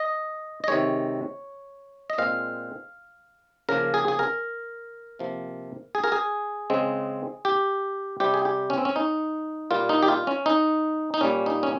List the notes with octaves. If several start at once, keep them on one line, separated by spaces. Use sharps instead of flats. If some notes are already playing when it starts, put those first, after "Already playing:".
Already playing: D#5
D#5
C3 D#3 G#3 C#5
D#5
A#2 G#3 C4 F5
C#3 F3 A#3 A#4
G#4
G#4
A#4
C3 F3 A#3
G#4
A#4
G#4
C#3 G#3 C4
G4
C3 G3 C4 G4
G#4
G4
C#4
C4
C#4
D#4
A#2 G3 A#3 F4
D#4
G4
F4
C#4
D#4
D#4
A#2 G3 A#3 C#4
D#4
C#4